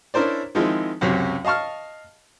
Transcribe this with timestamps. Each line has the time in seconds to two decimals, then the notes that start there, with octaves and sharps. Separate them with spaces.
0.14 C#4 D4 E4 A#4 C5 D5
0.55 D#3 F3 G#3 C4 D#4 E4
1.01 C#2 F#2 C3 F#3
1.45 D#5 F5 A5 C#6 F6